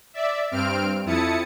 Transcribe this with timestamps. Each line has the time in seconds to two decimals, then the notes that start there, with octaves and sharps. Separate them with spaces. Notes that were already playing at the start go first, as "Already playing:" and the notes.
0.14 D5 E5
0.51 G2 C4 F6 D7
1.05 F2 E4 A5 D#6 C#7